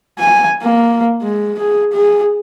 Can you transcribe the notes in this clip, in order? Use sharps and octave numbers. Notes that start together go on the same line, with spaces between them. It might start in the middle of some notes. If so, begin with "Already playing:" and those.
G#5
A#3
G#3
G#4
G#4